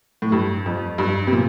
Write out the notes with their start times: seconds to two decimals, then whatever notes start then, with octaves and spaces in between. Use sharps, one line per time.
0.22 A2
0.32 G2
0.66 F2
0.98 G2
1.27 C3
1.33 A#2